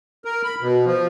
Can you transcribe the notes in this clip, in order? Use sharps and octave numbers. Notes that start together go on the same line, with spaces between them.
A#4
B5
B2
F3